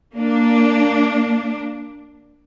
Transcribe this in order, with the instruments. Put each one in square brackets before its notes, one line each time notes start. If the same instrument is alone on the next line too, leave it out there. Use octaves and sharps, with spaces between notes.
[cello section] A#3 D4